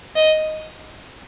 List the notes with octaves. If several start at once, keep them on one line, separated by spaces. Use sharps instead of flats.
D#5